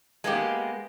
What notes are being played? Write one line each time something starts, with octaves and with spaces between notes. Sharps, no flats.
G#3 A#3 B3 D4 G4